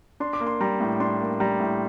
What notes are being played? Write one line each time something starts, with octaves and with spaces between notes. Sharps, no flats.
D4 C6
D6
A#3
C6
G3 A#5
A2
D4 C6
A#3
G3 A#5
A2